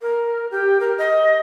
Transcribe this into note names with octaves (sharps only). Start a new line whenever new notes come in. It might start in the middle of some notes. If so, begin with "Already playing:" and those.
A#4
G4
A#4
D#5